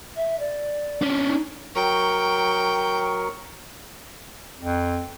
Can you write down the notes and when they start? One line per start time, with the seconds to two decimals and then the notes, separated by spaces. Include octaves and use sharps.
0.16 E5
0.40 D5
1.02 C#4 D4
1.28 D#4
1.76 F#3 A#4 G5 C#6
4.60 F2